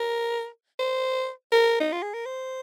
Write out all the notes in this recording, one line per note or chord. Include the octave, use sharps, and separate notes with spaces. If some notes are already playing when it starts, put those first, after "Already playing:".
Already playing: A#4
C5
A#4
D#4
F4
G#4
A#4
C5